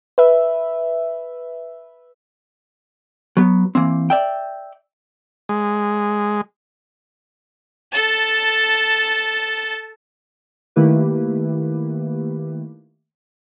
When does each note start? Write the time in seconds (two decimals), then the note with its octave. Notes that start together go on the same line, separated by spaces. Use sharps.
0.18 B4 E5
3.37 F#3 B3
3.75 E3 A#3 C4
4.10 D5 E5 G5
5.49 G#3
7.92 A4 A5
10.76 D#3 A3 A#3 E4 G4 B4